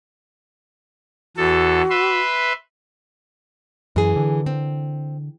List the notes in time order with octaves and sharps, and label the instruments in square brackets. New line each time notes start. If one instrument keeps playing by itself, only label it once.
[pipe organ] E2 A4 [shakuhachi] F#4
[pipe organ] B4 E5 C6
[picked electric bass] F#2 [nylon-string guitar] E3 G#4
[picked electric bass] D3
[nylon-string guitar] C4